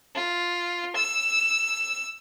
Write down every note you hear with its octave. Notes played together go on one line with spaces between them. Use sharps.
F4
E6